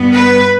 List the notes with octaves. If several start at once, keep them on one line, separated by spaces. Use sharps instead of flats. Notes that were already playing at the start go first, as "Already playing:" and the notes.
Already playing: G2 G3 B3
B4